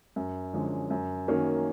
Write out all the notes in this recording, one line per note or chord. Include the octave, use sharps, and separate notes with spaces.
F#2
D3 F3 G#3 C#4
F#2
D#3 F#3 A#3 C#4